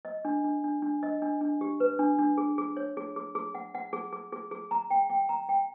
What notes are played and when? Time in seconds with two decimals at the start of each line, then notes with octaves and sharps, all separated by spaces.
0.05 D#5
0.25 D4
0.44 D4
0.64 D4
0.82 D4
1.03 D#5
1.22 D4
1.41 D4
1.61 G4
1.80 B4
1.99 D4
2.19 D4
2.38 G#4
2.58 G#4
2.77 C#5
2.97 G#4
3.16 G#4
3.35 G#4
3.55 F#5
3.75 F#5
3.93 G#4
4.13 G#4
4.32 G#4
4.51 G#4
4.71 A#5
4.90 G5
5.10 G5
5.29 A#5
5.49 G5